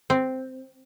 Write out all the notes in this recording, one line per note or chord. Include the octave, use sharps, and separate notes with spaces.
C4